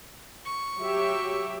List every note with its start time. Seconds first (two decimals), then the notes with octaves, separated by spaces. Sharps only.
0.45 C#6
0.80 F#3 G4 E5